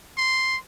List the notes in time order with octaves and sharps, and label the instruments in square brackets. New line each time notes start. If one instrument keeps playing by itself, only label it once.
[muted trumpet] C6